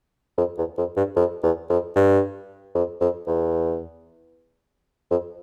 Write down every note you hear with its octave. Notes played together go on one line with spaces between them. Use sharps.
F2
E2
F2
G2
F2
E2
F2
G2
F2
F2
E2
F2